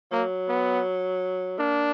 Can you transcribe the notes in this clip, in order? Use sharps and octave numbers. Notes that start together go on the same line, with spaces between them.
F#3 A#3
B3
A#3 D4